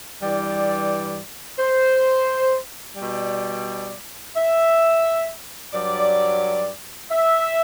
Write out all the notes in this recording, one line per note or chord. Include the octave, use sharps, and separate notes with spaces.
G2 E3 G3 D5
C5
B2 G3 D5
E5
G2 F#3 D5
E5